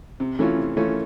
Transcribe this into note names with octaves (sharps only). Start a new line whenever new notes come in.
C3
E3 A3 C#4 F4
C3
E3 A3 C#4 F4